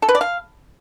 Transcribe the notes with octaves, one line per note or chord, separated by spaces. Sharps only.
A4
B4
D5
F5